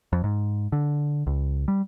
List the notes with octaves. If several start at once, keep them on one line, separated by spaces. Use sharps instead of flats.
F2
G#2
D3
C#2
G3